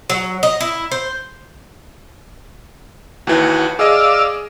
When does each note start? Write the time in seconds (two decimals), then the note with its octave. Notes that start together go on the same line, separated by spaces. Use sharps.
0.10 F#3
0.43 D#5
0.61 E4
0.92 C5
3.27 D#2 E3 F#4
3.79 G#4 D5 D#5 F5 E6